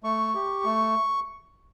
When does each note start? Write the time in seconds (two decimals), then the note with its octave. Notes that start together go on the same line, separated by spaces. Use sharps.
0.03 A3 C#6
0.34 G4
0.64 A3